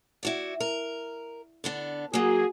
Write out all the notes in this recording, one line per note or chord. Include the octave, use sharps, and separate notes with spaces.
E4 F#4 D5
A#4
D3 B3 D4
F#3 A#3 F#4 G#4